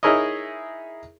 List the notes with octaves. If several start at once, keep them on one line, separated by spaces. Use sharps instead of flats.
D#4 E4 G#4 A#4 C#5 D#5